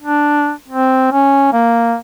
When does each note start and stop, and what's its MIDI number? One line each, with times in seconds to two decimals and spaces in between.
0.01 0.51 62
0.68 1.10 60
1.12 1.53 61
1.53 1.95 58